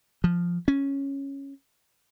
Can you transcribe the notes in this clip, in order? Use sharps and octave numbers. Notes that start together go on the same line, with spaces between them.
F3
C#4